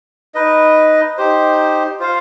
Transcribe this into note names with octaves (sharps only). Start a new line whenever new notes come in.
D#4 B4 D#5
D#4 G4 C5
F4 C5 F5